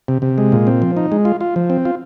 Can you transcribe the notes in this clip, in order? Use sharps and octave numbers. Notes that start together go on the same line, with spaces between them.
C3
C3
G#3
A#2
C4
F3
D#4
G#3
F4
F4
F3
C4
F4